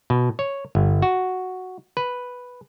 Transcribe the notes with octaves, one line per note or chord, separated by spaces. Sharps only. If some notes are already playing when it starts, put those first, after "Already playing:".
B2
C#5
G1
F#4
B4